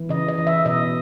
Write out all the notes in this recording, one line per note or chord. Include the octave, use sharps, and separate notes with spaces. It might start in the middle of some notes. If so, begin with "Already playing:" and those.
Already playing: E3
C#3 D#5
D#5
E3
E5
B2 D#5